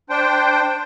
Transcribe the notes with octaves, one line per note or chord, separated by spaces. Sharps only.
D4 C5 G5